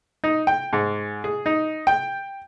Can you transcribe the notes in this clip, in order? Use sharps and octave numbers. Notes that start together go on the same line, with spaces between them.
D#4
G5
G#2
G#4
D#4
G5